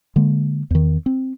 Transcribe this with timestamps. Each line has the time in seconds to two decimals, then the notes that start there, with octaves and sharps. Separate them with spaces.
0.16 D3 G#3 A#3
0.71 E2 D#3
1.06 C4